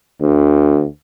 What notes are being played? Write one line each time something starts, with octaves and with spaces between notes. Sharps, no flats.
D2